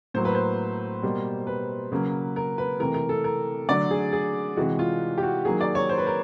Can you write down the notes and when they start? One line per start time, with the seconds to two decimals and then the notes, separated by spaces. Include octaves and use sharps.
0.14 A2 F#3 A#3 C5
0.25 B4
0.35 C5
1.03 B2 G3 A#3
1.47 B4
1.92 C#3 F#3 A#3
2.36 A#4
2.58 B4
2.80 C3 E3 A3 A#4
2.94 A#4
3.09 A4
3.24 A#4
3.68 D3 F#3 A3 D5
3.91 G#4
4.12 G#4
4.57 C3 E3 G#3 F#4
4.79 F4
5.18 G4
5.23 F#4
5.45 D#3 F#3 A#3 G#4
5.61 D5
5.75 C#5
5.89 C5
5.98 B4
6.07 A#4